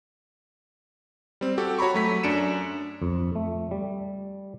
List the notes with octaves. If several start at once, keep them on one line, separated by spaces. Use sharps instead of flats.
G3 C4
F#4 G4 A4
F#4 C#5 A#5 B5 C#6
F#3 A3 B6
F#2 D4 C#7 D7 E7
F2
A3
G3